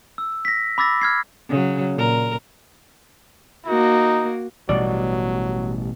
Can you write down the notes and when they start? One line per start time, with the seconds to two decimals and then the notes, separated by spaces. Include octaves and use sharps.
0.18 E6
0.45 A#6 B6
0.78 B5 D6 E6 A6 A#6
1.01 F6 G#6 C7
1.49 C#3 F#3
1.95 A#2 A#4
3.66 A#3 D#4 F#4
4.69 A1 B2 F#3 G3 D5